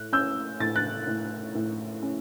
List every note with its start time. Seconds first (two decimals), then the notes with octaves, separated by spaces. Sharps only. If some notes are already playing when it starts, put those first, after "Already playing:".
Already playing: A2 F#6
0.13 C#4 E6 G6
0.60 A2 A6
0.76 F#6 A6
1.07 A2
1.55 A2
2.03 C#4